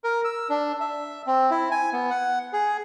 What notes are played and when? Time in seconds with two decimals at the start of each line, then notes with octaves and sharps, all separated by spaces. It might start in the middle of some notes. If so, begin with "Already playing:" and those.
0.04 A#4
0.24 E6
0.49 D4
0.80 E5
1.27 C4
1.51 E4
1.71 G#5
1.93 B3
2.11 F#5
2.53 G#4